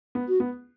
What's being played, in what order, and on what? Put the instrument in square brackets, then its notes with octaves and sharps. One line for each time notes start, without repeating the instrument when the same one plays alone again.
[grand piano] B3
[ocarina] F#4
[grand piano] B3